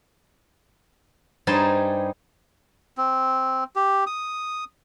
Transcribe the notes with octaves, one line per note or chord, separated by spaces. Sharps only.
G2 G3 D#4 G#4 C5 A5
C4
G4
D#6